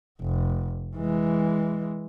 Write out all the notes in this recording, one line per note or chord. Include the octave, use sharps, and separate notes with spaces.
F1
E3 G#3